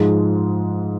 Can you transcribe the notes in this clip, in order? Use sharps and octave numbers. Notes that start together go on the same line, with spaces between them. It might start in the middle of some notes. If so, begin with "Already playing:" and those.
Already playing: G#2 F3 G#3